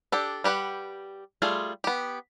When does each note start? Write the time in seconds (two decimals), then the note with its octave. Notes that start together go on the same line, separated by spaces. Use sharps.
0.12 D4 G4 A4
0.44 G3 G4 B4 F#5
1.42 G3 A3 F4 G#4
1.84 B3 G4